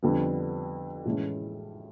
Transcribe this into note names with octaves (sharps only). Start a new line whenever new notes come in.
F2 D3 G3 B3
A2 E3 G#3 C#4